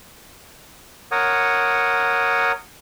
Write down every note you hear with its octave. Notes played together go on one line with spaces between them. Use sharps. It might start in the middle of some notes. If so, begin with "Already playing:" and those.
A#4 C#5 F#5 D#6